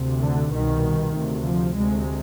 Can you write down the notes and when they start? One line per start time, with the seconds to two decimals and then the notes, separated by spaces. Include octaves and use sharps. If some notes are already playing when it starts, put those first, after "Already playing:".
Already playing: D2 C3
0.21 D3
0.52 C2 B2 D#3
1.14 D2 C3
1.45 F3
1.76 D2 C3 G#3